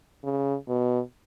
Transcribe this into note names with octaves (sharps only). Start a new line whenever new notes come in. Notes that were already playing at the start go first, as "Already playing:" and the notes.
C#3
B2